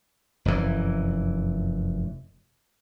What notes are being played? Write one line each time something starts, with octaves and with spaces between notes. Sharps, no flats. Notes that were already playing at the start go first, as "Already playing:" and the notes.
F1 F#2 A2 E3